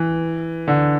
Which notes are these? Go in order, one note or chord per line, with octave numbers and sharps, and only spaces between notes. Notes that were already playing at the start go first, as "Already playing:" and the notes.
Already playing: E3
D3